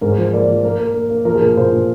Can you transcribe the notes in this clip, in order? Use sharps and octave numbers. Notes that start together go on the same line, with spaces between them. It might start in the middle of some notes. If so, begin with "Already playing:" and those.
G#2 A#4
C5
F3
A#3 D5
F3
A#3 A#4
A#3
A#3
A#3
F3 A#4
G#4
A#2 A#4
A#2 C5
A#2